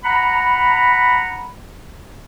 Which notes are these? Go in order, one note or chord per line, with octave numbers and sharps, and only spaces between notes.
F#5 A#5 B5